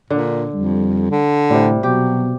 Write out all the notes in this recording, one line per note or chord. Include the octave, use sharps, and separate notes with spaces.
A#2 D3
F2 G3
D3
A2 C3 G3
B2 F#3 G4